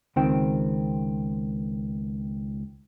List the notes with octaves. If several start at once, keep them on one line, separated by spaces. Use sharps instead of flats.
C#2 D#3 C4 G5